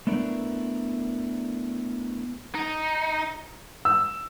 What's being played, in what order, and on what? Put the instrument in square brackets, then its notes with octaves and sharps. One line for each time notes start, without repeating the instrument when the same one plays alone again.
[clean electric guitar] A3 B3 D4 E4 A#4
[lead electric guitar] D#4
[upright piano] E6